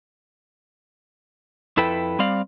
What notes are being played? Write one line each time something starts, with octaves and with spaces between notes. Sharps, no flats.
F2 E4 A4 B4 G5
G3 C4 D5 F5